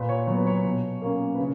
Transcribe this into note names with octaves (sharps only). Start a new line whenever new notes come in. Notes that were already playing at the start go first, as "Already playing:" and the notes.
Already playing: A#2 B4
C#5
F#3 B3 C#5
C#5
B2
A#3 C#4
B4
C#3